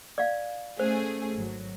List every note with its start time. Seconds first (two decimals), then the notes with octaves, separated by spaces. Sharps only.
0.18 D5 F5
0.80 A3 C#4 G#4 C5
1.35 G#1 F#3